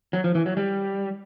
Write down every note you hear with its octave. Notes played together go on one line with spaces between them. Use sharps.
F#3
F3
E3
F#3
G3